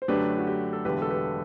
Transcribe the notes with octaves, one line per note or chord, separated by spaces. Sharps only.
C5
F#2 D3 F#3 A3 D4 G4 B4
F#4
G4
A4
E1 E2 D3 G4 B4
A4
G4 B4